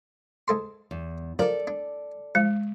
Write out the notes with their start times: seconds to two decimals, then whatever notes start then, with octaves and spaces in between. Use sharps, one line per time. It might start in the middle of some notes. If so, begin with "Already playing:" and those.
0.48 G#2 A4 C6
0.91 E2
1.39 F3 A4 A#4 D5
1.67 D4
2.35 F3 G#3